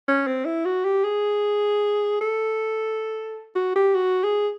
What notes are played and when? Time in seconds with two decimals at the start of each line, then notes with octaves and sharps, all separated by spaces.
0.08 C#4
0.27 C4
0.46 E4
0.65 F#4
0.85 G4
1.04 G#4
2.21 A4
3.56 F#4
3.76 G4
3.95 F#4
4.24 G#4